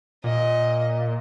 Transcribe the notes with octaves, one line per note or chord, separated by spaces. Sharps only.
A#2 D#5